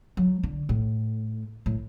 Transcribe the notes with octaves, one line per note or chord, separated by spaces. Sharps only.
F#3
D3
A2
A2